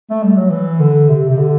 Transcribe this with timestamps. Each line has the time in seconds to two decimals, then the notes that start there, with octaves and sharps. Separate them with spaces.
0.10 A3
0.23 G3
0.37 F#3
0.50 E3
0.80 D3
1.09 C3
1.29 C3
1.38 D3